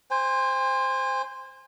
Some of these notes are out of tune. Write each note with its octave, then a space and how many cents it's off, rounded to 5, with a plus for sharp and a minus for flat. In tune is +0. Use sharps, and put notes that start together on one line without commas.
C5 +0 G#5 -40